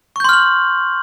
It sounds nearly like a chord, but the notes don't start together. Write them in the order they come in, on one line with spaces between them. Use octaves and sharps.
C#6 G6 C6 F6 F#7